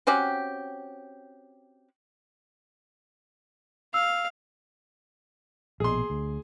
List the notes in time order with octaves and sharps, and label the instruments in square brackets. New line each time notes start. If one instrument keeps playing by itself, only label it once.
[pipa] C4 C#4 F#4 G4
[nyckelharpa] F5 [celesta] E6
[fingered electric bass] A#1 B2 [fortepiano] G#4 C6
[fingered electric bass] D2